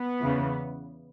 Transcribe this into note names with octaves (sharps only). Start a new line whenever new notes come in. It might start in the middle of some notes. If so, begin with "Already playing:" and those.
Already playing: B3
E2 C#3 E3